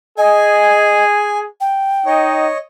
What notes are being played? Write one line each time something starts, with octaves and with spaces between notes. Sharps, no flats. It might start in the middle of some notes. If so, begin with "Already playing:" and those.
G#4 D#5 G#5
G5
D#4 C#5 D#5